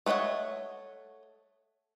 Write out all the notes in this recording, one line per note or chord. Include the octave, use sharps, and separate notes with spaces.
A3 B3 C#5 D#5 F#5